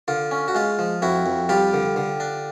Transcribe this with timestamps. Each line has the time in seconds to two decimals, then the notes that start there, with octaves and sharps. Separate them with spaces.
0.08 D3 F4
0.31 C#4
0.48 F#4
0.55 G#3 F4
0.79 F3
1.02 F2 E4 F#4
1.26 F2
1.49 G3 F4 G4
1.73 D3
1.96 D3
2.20 D4